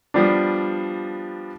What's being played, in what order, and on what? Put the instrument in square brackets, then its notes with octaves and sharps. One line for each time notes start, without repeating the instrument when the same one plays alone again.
[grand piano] F3 G3 B3 D4